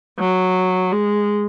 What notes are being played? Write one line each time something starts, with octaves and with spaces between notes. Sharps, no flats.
F#3
G#3